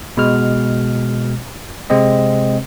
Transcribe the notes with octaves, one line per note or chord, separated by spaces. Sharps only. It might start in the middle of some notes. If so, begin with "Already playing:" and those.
B2 G#3 F6
C3 G#3 C4 D#5